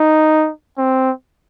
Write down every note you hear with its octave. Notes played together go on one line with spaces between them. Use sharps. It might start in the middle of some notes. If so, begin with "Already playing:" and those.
Already playing: D#4
C4